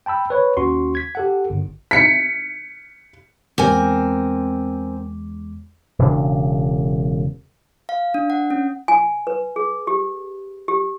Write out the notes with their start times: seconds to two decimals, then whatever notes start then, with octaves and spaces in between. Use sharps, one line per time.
0.06 G5 A5 B5 E6
0.30 B4 C#5
0.57 D#2 C#4 F#4 C6 C#6
0.95 G#6 B6
1.15 G4 A4 F#5
1.50 G1
1.91 B6 C#7
3.58 E2 G#3 C4 A#4 G#5 D6
5.99 E1 C#3 C4 D4
7.89 F5
8.14 D4
8.30 F#5
8.50 C#4
8.88 G#5
9.27 B4
9.56 G#4
9.87 G4
10.68 G4